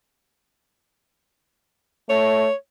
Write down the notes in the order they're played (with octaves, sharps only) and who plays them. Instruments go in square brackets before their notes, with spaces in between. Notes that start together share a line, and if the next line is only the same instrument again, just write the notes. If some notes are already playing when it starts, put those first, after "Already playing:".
[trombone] A3 [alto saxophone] C#5